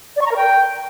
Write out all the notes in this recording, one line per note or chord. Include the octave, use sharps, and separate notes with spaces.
D5
C#6
A#5
A#4
G5